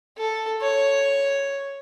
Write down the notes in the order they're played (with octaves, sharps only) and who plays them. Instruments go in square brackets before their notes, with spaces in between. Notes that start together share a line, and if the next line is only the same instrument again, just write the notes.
[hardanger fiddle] A4
C#5